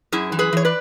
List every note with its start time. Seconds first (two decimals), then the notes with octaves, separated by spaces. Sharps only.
0.12 F#2 E4 G#4
0.32 E3
0.39 G#4 B4
0.53 E3 C#5
0.65 B4 D5